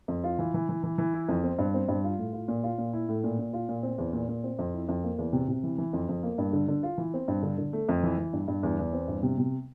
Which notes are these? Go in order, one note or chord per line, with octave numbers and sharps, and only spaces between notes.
F2
F4
E3
E3
E3
E3
E3
E4
F2
C4
G2
C4
G2
F4
A2
F4
A#2
F4
A#2
E4
A2
A#2
A#2
F4
A#2
C4
E2
A#2
A#2
C4
F2
E4
F2
A#3
E2
C3
C3
E3
E3
F2
F2
A#3
G2
D3
D3
F4
E3
C4
G2
D3
D3
A3
F2
E3
E3
G2
G2
E2
E2
C4
G2
C3
C3